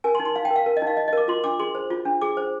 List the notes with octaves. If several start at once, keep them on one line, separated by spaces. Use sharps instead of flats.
A#4 G#5
C6
D#4
C6
D#4 F5
G5
A#4
F5
A#4
D#5
D#4 F5
D#4 D#5
D#5
A#4 D6
F4 C6
D4 D6
G#4 C6
C5
F4
D4
G#4 D6
C5